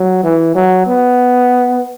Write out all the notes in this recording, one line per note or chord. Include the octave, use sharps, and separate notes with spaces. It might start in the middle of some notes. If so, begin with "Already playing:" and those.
Already playing: F#3
E3
F#3
B3